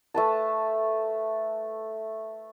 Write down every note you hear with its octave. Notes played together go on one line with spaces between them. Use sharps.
A3 B4 A5